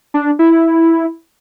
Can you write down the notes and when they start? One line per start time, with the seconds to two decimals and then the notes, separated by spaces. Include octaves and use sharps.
0.14 D4
0.39 E4